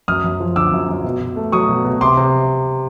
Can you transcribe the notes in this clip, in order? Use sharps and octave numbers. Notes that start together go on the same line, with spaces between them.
F#2 D#6 F6
F#2
F3
D3 D6 E6
F#2
F#2
B2
B2
A3
F#3 C#6 D#6
B2
B2
C3 C6 D6
C3